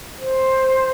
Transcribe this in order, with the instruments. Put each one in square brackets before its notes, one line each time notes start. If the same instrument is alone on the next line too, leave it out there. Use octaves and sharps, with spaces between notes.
[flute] C5